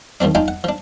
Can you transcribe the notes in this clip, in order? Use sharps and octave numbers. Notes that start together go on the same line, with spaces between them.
D#2 F3 G3 C4 D4
D4 D#4 F4 G5 G#5
F#5
F3 D4